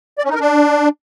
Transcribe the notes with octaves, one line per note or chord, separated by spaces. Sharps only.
D5
C#4
D#4
A#4
D4